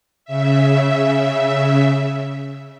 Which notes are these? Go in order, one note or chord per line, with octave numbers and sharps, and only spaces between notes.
C#3 E5